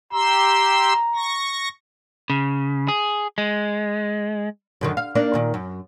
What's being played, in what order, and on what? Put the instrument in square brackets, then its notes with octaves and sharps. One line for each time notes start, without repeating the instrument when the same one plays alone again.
[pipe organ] G4 C6 E6 [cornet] A#5
[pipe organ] C#6 A#6
[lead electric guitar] C#3
G#4
G#3
[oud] F#2 D3 D#3
F5
A#3 D4 D#4
A#2 D#3
F#2